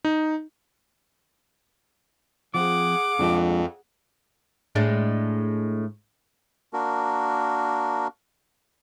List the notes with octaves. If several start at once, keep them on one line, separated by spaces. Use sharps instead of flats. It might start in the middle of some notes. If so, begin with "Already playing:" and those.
D#4
F3 C4 F4 G#4 F#5 D6
F2 F3 G#3 D4
A2 G#3 D4
A#3 D4 F#4 A#4